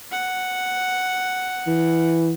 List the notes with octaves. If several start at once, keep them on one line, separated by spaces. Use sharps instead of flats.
F#5
E3